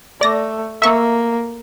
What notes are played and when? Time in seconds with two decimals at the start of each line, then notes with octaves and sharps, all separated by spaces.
0.21 A3 D5 A#6
0.82 A#3 E5 C#6